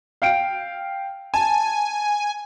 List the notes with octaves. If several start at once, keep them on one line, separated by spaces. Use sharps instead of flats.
F5 G5 D7
G#5 A5